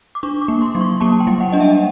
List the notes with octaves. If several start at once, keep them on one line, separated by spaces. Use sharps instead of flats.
D6
D4 C#6
D6
A#3
C6
F#3
C#6
A#3 A5
G5
G3
F#5
D4 D#5
E5